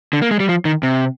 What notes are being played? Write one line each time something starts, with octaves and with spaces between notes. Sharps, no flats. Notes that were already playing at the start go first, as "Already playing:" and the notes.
D3
A#3
G#3
G3
F3
D#3
C3